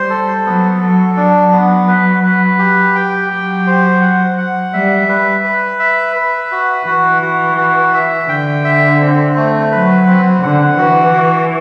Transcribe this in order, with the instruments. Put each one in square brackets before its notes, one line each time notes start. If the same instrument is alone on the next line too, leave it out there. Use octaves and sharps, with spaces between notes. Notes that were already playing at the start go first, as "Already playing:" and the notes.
Already playing: [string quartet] G3 [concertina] C5
[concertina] A4
[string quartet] F#3 [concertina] B3
[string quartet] F#3 [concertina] A4
[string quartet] F#3 [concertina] D4
[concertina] B3
B4
B4
G4
G5
[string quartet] F#3 [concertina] G4
[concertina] C5
F#5
F#5
[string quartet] G3 [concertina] E5
[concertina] B4
B4
E5
B4
F#4
[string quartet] E3 [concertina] F#4
[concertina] F#4
F#4
E5
[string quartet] D3 [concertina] G5
[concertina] E5
C4
A3
[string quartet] F#3 [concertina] B4
[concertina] C4
[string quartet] D3 [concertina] F#5
[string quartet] E3 [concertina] F#4
[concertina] F#4